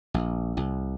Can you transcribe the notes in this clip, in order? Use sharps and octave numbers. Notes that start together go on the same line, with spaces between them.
A#1
C2